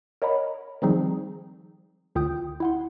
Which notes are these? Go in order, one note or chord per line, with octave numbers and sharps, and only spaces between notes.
A#4 C#5 D#5 F#5 A#5 B5
D#3 F3 G3 C4 D#4 G#4
D2 D3 F4 G5 D#6 G6
E4 F#5 C6